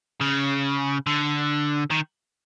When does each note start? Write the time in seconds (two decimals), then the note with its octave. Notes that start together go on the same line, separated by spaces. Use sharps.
0.21 C#3
1.07 D3
1.91 D#3